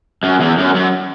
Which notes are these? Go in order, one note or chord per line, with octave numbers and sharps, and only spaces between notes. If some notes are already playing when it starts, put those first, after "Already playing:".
F#2
E2
F#2
F#2